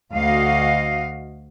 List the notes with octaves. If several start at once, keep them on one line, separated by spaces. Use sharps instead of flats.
D2 F#4 D#5 F5